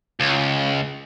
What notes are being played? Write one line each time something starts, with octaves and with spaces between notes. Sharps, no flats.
C#2